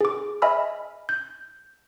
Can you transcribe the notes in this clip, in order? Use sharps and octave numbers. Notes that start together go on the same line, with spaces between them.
G#4 D6
D#5 E5 G#5 B5 E6 F6
G6